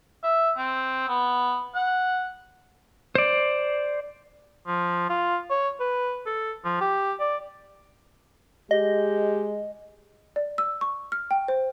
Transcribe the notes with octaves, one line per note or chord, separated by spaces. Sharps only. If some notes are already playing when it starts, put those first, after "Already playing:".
E5
C4
B3
F#5
C5 D5
F3
F4
C#5
B4
A4
F3
G4
D5
G#3 G4 D#5
D5
E6
C#6
F6
G5
C5